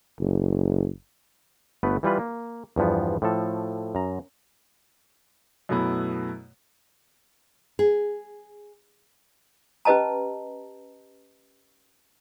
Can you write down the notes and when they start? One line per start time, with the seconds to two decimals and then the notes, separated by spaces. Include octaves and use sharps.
0.19 F#1
1.83 G1 A3 B3 B4
2.03 E3 G3 F4 B4
2.19 A#3
2.76 E2 G2 F3 B3
3.22 A2 F3 A4
3.95 F#2 A#5
5.69 F#2 B2 A3 B3 E4
7.79 G#4
9.85 C#4 G4 B4 D#5 A5 A#5